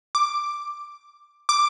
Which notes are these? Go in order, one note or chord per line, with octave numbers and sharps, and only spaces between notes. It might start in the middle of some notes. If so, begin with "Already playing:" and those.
D6
D6